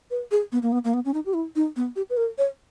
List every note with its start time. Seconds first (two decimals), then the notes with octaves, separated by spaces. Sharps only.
0.11 B4
0.31 G#4
0.52 B3
0.62 A#3
0.72 B3
0.84 A#3
0.94 B3
1.05 C#4
1.14 D#4
1.26 G4
1.34 E4
1.56 D#4
1.76 B3
1.96 G4
2.10 B4
2.17 A#4
2.38 C#5